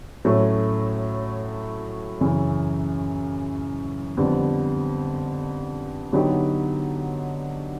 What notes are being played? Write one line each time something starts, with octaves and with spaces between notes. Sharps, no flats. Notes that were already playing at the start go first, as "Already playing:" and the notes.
A2 F#3 A3 C#4
F#2 C#3 E3
F2 D3 G3 B3
D3 F#3 B3 D#4 G4